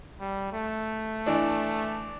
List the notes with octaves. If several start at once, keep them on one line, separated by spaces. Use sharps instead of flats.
G3
A3
E3 D4